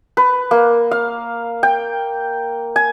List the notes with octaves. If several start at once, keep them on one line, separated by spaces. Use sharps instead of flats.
B4
A#3
F5
G5
G#5